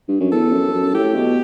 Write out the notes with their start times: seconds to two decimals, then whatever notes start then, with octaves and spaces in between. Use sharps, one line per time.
0.08 G2
0.20 F#2
0.32 E2 A4
0.52 F#2
0.74 F#2
0.94 A2 G4
1.15 B2